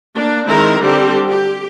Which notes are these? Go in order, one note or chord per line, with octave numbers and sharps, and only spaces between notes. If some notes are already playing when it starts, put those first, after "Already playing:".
A#3 D4
D#3 G#3 C4 E4 A#4
D3 G3 C4 G4
G4